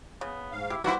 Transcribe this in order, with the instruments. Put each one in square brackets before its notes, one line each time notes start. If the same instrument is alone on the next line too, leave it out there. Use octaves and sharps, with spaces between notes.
[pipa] C#3 [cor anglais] B3
[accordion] G#2 F5
[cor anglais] E4 [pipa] G4
[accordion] G3 [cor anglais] A#3 [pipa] B3 G4 C5 [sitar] E4 F#4